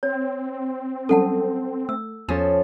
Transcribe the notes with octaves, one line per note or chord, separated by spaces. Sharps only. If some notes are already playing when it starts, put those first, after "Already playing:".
C4 C#5
F#3 G3 C#4 A4 F#5 A5
A3 E6
E2 F3 C#4 A4 G#5 D#6